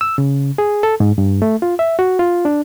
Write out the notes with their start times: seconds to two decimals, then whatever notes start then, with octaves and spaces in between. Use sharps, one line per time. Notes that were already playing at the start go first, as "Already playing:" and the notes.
0.01 E6
0.18 C#3
0.58 G#4
0.83 A4
1.00 G#2
1.18 G2
1.42 A3
1.62 F4
1.79 E5
1.99 F#4
2.19 F4
2.45 D4